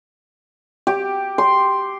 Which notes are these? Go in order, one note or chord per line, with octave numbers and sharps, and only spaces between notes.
G4
C6